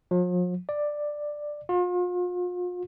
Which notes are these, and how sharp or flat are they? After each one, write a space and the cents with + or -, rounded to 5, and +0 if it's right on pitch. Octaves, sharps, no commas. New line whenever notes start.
F3 +45
D5 +10
F4 +40